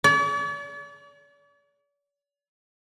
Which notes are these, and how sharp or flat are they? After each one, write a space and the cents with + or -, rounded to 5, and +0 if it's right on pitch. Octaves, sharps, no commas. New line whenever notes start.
D5 -45